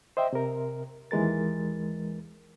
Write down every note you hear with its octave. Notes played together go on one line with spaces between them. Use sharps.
C5 D#5 E5 G5
C3 A#4
D#2 E3 G#3 A#4 A6